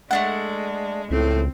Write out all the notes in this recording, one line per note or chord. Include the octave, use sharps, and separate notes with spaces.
G#3 A3 D4 F#5
C#2 A2 C4